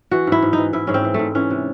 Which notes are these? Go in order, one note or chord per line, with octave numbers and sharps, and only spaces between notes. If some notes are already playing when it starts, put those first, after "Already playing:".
E3 F#4
G#2 E4
G#2
E3 D#4
G#2 E4
G#2 C#4
C4
E3
G#2 A3
E3 C#4
C3